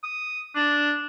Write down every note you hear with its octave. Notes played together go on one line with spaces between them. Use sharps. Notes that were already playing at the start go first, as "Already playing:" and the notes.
D#6
D4